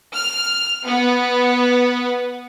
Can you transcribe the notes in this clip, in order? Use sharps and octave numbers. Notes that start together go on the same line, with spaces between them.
F6
B3